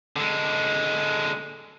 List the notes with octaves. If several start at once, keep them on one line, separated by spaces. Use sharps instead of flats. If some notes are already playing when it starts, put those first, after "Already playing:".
D3 G#3